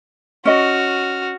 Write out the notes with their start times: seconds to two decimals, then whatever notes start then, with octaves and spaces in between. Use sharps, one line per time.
0.45 C#4 F#4 D#5 F6